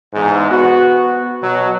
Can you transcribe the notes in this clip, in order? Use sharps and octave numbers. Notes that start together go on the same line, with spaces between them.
E2 G#2
B3 F#4
B2 F#3